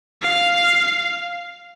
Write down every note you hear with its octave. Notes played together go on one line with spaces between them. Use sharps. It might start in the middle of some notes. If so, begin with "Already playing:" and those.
F5